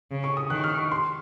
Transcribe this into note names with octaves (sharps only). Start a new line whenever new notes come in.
C#3
C#6
D#6
D#3 F#6
F6
C#6
C6